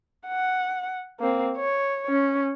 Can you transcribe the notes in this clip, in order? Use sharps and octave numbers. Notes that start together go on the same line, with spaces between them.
F#5
A#3 C4
C#5
C#4